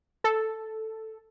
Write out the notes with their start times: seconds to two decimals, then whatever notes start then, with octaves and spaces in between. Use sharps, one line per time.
0.24 A4